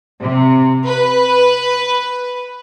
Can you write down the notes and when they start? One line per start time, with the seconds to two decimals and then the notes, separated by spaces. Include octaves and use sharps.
0.23 C3
0.87 B4